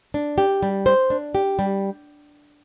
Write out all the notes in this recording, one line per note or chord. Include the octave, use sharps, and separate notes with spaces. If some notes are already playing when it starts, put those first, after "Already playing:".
D4
G4
G3
C5
D4
G4
G3